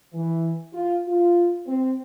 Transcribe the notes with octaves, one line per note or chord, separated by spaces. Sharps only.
E3
F4
F4
C4